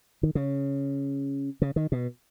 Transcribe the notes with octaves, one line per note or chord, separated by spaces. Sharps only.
D#3
C#3
C#3
D#3
B2